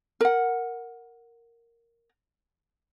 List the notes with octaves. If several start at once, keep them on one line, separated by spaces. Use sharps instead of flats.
A#4 F#5